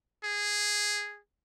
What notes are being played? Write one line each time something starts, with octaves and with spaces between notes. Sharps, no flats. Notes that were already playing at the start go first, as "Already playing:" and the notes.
G#4